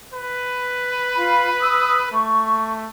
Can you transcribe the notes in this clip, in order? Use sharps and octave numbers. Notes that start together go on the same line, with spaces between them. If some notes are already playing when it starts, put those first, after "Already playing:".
B4
F4 B5
D#6 E6
A3 C#6